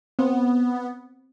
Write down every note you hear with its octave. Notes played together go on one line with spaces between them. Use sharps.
B3 C4